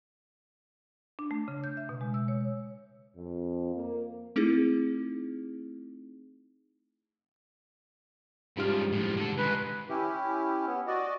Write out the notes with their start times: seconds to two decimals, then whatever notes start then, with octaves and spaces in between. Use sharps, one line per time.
1.19 D4
1.31 A3
1.48 C#3
1.64 G6
1.77 E5
1.89 B2
2.01 G#3
2.14 E6
2.28 C#5
3.16 F2
3.74 A#3
4.36 A3 C4 D#4 E4 G#4
8.57 G#2 C#3 F3 G3 F6
8.92 A2 F3
9.17 D3 A4
9.38 D#3 G#3 B4
9.89 C#4 E4 G4
10.67 B3
10.87 F#4 D5 D#5